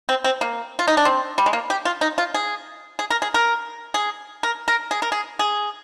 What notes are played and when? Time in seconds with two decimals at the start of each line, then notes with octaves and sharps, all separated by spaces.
0.09 C4
0.24 C4
0.41 A#3
0.79 F4
0.88 D#4
0.97 D4
1.05 C4
1.38 G3
1.46 G#3
1.53 A#3
1.70 G4
1.85 F4
2.01 D#4
2.18 F4
2.34 G#4
2.99 G#4
3.10 A#4
3.22 G#4
3.34 A#4
3.94 G#4
4.43 A#4
4.68 A#4
4.91 G#4
5.02 A#4
5.12 G#4
5.39 G#4